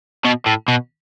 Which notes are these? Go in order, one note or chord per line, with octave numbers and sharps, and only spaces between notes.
B2
A2
B2